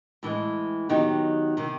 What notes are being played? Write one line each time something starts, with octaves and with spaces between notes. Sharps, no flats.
A2 E3 G#3
D#3 F#3 B3 D#4 G4
C3 D#3